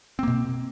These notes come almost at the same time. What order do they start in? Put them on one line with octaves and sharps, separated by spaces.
C4 A#3 B2